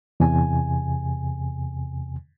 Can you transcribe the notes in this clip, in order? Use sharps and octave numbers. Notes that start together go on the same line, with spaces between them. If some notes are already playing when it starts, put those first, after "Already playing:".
E2 C3 G#5